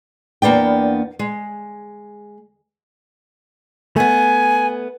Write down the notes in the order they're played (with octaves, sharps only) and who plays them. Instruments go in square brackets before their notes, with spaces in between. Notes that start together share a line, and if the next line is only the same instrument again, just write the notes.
[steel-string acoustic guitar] E2 A#3 B3 D4 G5
G#3
[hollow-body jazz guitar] A3 B3 [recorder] G#5